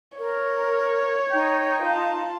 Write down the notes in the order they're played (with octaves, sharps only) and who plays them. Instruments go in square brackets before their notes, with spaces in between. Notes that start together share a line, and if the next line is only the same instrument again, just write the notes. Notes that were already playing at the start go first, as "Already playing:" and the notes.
[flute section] A#4 [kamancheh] C#5
[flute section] D#4 [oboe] G5
[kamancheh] F4 A5